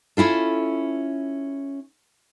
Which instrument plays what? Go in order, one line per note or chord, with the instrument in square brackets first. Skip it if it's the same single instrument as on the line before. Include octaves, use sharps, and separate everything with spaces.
[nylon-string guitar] C#4 E4 F4 A4